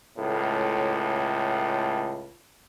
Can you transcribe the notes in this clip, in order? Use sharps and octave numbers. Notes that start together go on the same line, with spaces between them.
C#2 A2